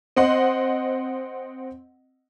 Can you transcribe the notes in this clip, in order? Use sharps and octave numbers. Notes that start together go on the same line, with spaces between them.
C4 D#5 F#5 C6